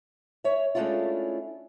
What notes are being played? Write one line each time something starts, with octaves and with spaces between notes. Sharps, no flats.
C#5 E5
G#3 A3 C#4 D4 E4 F4